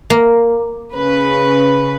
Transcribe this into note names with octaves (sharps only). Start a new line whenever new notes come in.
A#3
C#3 B4